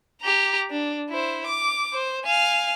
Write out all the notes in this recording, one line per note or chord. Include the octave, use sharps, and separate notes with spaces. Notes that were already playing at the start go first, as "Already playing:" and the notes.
G4 A#5
D4
E4 C5
D6
C5
F5 G#5